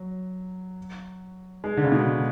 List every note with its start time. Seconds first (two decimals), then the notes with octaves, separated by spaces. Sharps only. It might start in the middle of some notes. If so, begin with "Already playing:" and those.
Already playing: F#3
1.64 G#3
1.77 D3
1.84 C#3
1.92 B2